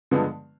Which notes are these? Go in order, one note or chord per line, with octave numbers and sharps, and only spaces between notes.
G2 D3 F3 G#3 B3